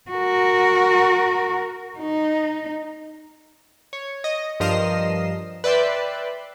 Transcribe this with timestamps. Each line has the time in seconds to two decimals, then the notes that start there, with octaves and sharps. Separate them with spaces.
0.11 F#4 A#4
1.99 D#4
3.93 C#5
4.24 D#5
4.60 G2 F3 A#4 D#5 C7 E7
5.64 B4 D5 E5 G5 C6